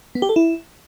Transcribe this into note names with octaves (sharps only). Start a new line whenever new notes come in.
B3
G4
A4
E4